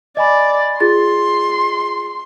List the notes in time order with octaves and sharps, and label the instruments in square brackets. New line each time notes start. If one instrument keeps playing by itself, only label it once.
[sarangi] D5 [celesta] D#5 G#5 B5
[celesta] F4 G#4 A6 [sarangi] C6